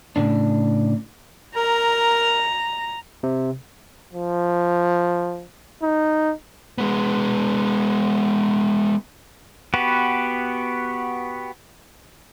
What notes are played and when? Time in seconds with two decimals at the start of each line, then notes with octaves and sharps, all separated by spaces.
0.16 A2 C#3 D4
1.56 A#4 A#5
3.23 C3
4.13 F3
5.83 D#4
6.78 G#3 B3
9.74 B3 F#4 G4 B4